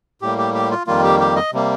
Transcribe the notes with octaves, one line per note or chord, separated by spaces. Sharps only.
A2 G3 A#3 G4
G4
G4
F4
F2 D#3 G3 A#3 F4
G4
G4
D#5
C3 G3 A#3